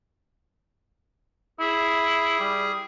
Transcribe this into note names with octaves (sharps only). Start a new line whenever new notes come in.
E4 G#4
G3